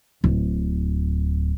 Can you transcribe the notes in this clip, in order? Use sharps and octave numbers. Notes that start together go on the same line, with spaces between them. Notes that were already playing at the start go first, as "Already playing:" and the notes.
D1